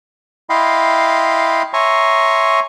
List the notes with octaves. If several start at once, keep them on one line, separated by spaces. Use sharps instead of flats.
E4 D#5 F5 G5 B5 C6
C#5 E5 G#5 A#5 C6 C#6